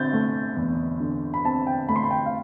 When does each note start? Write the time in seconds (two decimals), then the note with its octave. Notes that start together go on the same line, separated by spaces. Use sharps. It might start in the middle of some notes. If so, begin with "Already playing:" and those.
Already playing: D3 C4 G6 A6
0.13 A3
0.57 E2
1.00 D3
1.34 B5
1.45 C4 A5
1.67 G5
1.89 A3 B5
1.96 C6
2.04 B5
2.11 G5
2.26 F5